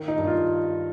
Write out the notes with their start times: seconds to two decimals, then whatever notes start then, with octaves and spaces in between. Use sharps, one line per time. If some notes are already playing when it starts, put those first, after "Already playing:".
Already playing: D#3
0.08 D#4
0.18 G2
0.27 F4